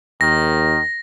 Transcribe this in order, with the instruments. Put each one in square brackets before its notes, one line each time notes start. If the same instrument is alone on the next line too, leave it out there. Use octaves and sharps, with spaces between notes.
[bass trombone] D#2 [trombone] D#3 [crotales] A#6